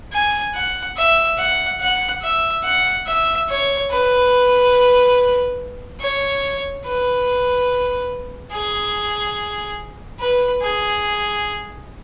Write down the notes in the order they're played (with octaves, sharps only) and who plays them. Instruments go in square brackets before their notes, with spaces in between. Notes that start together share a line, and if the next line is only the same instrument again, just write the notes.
[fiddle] G#5
F#5
E5
F#5
F#5
E5
F#5
E5
C#5
B4
C#5
B4
G#4
B4
G#4